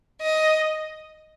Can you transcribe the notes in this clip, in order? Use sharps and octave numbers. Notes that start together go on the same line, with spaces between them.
D#5